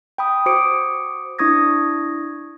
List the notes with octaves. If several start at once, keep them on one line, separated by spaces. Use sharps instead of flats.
G5 B5 D#6
F#4 C5 D6 D#6 C#7 D7
D4 E4 C#6 D#6 G#6 A#6